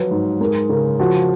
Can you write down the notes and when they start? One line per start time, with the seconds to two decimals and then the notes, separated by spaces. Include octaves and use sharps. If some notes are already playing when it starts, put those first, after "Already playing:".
Already playing: F3 F#3 B4
0.11 G#2
0.40 G#3 A#4
0.69 C#3 A#4
0.99 F3 F#4